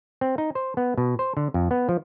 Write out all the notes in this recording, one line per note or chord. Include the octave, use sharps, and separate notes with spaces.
C4
D#4
C5
B3
B2
C5
D3
F2
B3
F3